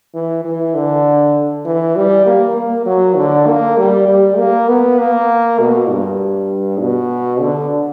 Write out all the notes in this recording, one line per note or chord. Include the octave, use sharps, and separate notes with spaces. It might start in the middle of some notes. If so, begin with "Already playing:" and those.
E3
E3
D3
E3
G3
A#3
A#3
F#3
D3
A#3
G3
G3
A#3
B3
A#3
B2
G2
B2
D3